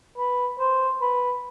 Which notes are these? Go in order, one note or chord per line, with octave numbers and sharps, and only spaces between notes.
B4
C5
B4